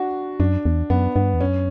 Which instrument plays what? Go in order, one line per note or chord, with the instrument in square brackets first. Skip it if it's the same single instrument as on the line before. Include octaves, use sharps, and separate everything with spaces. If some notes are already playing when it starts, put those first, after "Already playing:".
Already playing: [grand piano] D4 F#4
[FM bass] F#2 [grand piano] D4
[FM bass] E2
[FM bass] F#2 [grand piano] B3
[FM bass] G2 [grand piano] B3
[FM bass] E2
[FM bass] F#2 [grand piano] C#4